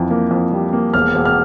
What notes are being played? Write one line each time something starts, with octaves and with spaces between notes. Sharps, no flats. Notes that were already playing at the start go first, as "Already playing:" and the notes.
Already playing: F2 E3
A#3
F2
G3
A#3
E1 F6
E1
F6